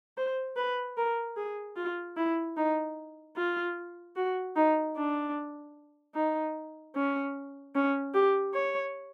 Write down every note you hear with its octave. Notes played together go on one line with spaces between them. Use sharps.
C5
B4
A#4
G#4
F4
E4
D#4
F4
F#4
D#4
D4
D#4
C#4
C#4
G4
C#5